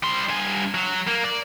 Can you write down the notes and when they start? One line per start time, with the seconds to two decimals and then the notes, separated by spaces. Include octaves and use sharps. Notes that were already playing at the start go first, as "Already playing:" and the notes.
0.03 G3 C6
0.29 G2 G#5
0.74 F#3
1.07 A#3
1.24 D5